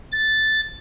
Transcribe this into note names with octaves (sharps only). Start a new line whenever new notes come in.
A6